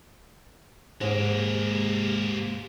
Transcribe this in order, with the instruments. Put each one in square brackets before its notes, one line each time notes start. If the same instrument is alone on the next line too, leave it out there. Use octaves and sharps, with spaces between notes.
[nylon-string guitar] G#2 [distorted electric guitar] G#3 A#3 [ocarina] G4